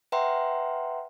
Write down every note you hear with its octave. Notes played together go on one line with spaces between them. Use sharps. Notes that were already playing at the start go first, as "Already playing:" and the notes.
B4 E5 F#5 G5 A#5 C6